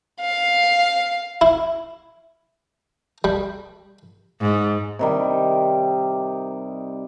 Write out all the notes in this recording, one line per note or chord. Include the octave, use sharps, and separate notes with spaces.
F5
E4
G3
G#2
C3 D#3 G3